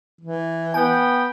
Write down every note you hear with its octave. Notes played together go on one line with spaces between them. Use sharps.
E3
B3 G5 G#5